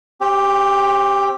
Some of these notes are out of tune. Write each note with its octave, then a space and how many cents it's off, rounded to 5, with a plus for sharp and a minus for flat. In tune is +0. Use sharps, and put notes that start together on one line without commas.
C4 +35 G4 +0